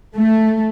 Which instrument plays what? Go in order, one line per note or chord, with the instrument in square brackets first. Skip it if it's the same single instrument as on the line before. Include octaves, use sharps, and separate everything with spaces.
[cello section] A3